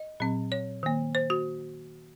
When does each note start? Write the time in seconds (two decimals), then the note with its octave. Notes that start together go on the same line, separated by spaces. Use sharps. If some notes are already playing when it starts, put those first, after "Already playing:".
Already playing: D#5
0.20 A#2 F#3 C4
0.52 C#5
0.83 D#3 A#3
1.15 C5
1.30 F#4